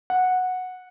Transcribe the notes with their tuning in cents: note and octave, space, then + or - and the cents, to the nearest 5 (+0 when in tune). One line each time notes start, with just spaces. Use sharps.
F#5 -10